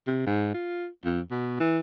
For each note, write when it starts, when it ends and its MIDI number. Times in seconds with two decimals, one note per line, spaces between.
0.07 0.22 48
0.26 0.50 44
0.54 0.87 65
1.04 1.20 41
1.31 1.57 47
1.60 1.80 52